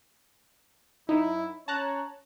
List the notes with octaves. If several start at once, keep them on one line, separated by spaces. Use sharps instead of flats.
F#2 D#4 E4
C#4 C#5 A5 A#5 F#6